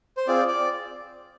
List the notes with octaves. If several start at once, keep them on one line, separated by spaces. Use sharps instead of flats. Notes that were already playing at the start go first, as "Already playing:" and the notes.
C5
C4 F4 G#4 D5
D5